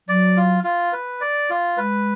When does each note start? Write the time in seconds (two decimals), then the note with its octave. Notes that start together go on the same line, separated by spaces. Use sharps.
0.08 F#3 D5
0.37 F4
0.64 F4
0.92 B4
1.21 D5
1.50 F4
1.77 G#3 B4